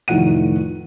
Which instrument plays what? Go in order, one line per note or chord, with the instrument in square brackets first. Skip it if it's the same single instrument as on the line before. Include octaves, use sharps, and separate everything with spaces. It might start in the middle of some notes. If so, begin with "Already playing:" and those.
[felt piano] F1 A2 D#3 F3 F#5 D#7